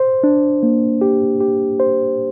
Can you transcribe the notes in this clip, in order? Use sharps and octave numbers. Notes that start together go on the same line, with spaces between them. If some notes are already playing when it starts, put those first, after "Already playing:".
Already playing: C5
D4
A#3
G4
G4
C5